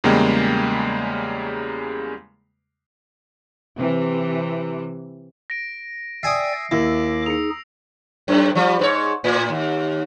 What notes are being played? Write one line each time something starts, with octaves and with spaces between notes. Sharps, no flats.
E2 C#3 G3 G#3 A#3 G5
C3 E3
A#6 D7
D5 E5 G5 G#5 D#6 C7 D7
D#2 E4 D6 E6 A#6
D#4 G#4 C#7 F7
F#2 A2
F3 G3
G#2 B4 C#5
A2
D#2